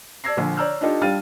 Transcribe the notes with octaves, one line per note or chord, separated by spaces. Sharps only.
D5 A5 E6 G#6 A#6 C7
A#1 D3
C#5 D5 A#5 E6 F6 G6
D4 D#4 F4 G4 A4
G3 D4 F5 F6 A6 D#7